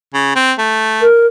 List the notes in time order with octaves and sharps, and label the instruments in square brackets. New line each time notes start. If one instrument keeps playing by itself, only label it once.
[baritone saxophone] C#3
C4
A3
[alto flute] A#4